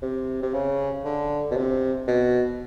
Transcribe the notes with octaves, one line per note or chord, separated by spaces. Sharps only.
C3
C3
C#3
D3
B2
C3
B2